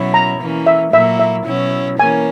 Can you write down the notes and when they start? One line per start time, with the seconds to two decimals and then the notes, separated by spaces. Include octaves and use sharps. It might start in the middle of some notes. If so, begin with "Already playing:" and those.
Already playing: B2 F#3 C#4 E4
0.14 A#5
0.40 E3 A#3 C#4
0.67 E5
0.93 A#2 F#3 A#3 E4 E5
1.19 E5
1.47 B2 F#3 C#4 E4
1.99 E3 A#3 C#4 G#5